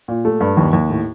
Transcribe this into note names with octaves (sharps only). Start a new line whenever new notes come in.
A#2
A3
G2
D#2
D#2
A2